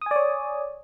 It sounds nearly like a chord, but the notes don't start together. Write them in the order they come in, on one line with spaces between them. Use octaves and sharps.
D#6 G#5 D5 C#5